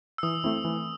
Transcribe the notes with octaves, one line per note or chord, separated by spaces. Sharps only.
E6
E3 D#6
A3 C4 E4
E3